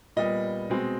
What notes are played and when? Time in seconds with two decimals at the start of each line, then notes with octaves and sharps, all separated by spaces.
0.16 A#2 G3 B3 D#5
0.70 B2 G#3 C4